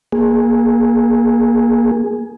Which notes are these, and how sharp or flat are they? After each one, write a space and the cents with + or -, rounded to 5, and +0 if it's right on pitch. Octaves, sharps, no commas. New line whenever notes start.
A#3 +20 G#4 +0